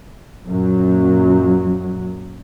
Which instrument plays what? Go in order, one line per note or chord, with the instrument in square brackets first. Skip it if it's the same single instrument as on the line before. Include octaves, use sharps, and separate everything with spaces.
[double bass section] A#1 F#2 A#2 F#3